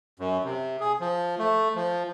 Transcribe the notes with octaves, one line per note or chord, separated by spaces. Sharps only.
F#2
C3
G#4
F3
A3
F3